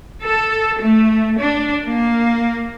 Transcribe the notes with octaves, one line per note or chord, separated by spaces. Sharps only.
A4
A3
D4
A#3